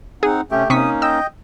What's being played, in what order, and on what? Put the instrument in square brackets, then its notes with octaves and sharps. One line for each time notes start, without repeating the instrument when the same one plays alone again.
[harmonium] C4 D#4 F#5 [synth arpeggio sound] G#4
[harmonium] C3 C#4 [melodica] A3 G4
[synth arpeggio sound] C3 C#6 B6 [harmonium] A#3 C#4 D#4 [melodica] D#6
[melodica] D#5 G5 [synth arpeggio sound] E6